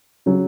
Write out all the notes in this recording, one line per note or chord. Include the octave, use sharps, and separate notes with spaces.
C#3 F#3